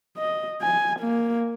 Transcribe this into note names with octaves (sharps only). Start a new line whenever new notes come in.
D#5
G#5
A#3